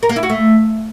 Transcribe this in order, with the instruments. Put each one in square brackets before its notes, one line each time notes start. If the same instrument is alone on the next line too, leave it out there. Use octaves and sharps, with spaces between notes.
[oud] A#4
A#3
E4
F#4
A3